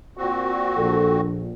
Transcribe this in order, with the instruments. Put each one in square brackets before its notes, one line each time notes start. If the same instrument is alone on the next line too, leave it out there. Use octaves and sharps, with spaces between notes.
[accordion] A#2 C4 F#4
[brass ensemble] A#1 [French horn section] A4